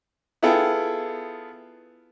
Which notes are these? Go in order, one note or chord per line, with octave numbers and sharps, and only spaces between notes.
B3 E4 F4 G#4 A4 G5